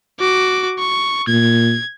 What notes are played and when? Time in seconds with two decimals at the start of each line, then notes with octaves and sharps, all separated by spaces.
0.20 F#4 D6
0.79 C#6
1.28 A#2 G#6